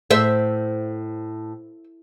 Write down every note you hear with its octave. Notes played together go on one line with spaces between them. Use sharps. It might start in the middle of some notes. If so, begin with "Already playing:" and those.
A2 C5 E5